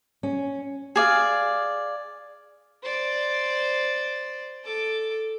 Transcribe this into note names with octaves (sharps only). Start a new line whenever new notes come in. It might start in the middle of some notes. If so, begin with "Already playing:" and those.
C#4
G#4 D5 F5
C5 D5
A4 D6